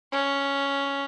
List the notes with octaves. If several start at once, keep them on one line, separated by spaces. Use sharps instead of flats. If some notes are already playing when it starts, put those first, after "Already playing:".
C#4